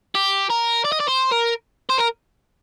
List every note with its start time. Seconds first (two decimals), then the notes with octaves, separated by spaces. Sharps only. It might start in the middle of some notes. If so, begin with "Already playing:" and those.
0.15 G4
0.50 A#4
0.85 D5
0.92 D#5
1.00 D5
1.08 C5
1.32 A#4
1.90 C5
1.98 A#4